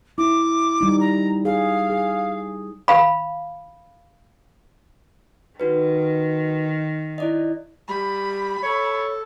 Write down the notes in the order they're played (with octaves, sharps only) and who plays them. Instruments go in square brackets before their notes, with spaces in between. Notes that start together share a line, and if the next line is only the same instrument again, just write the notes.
[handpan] E4 [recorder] D6
[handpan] G3 D#4
[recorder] A#5
[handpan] G#4 [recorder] F5
[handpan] G#4
[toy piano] F5 B5
[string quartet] D#3 [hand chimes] D#4 F#4 B4
[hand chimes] E4 D5 D#5
[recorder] G3 [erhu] B5
[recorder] A4 [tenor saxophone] C#5